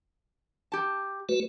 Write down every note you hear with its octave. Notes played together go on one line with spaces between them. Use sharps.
G4 A5
A3 F#4 B4